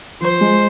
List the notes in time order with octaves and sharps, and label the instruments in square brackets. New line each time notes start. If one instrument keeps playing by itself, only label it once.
[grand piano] F3 [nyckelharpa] C5
[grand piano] G#3